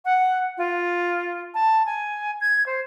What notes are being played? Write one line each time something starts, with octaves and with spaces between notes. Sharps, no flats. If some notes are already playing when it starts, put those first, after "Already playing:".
F#5
F4
A5
G#5
G#6
C5